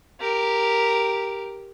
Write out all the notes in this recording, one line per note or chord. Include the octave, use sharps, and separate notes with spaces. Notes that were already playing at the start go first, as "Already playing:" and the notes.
G4 A#4